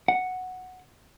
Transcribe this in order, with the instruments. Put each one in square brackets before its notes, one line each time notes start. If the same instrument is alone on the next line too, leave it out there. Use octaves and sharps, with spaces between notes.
[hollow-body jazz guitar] F#5